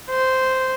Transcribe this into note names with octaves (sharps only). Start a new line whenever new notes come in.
C5